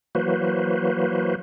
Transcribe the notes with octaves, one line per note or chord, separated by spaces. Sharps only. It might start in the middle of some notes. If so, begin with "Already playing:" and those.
E3 F#3 A#3 F#4 B4 C5